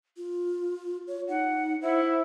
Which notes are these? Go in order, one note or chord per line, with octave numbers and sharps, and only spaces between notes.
F4
C#5
D#4 F#5
E4 C5